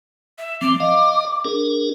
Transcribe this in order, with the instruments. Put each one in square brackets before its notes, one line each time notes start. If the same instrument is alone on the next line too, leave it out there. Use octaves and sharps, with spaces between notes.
[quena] E5
[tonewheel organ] F3 C4 [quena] D6
[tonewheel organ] D#5 F5
D4 G#4 A#4